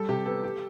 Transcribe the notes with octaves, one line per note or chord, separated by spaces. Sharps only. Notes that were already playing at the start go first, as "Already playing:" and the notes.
Already playing: G3 A4
C3 G4
B3 A4
G4